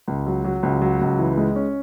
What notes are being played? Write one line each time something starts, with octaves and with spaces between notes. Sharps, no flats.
C#2
F#3
F#3
C#2
F#3
C#2
E3
G#3
C#4